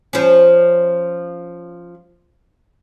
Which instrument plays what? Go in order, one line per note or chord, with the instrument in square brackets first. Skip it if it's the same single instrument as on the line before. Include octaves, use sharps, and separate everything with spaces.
[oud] F3 C#4